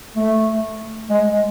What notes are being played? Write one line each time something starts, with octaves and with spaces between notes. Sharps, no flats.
A3
G#3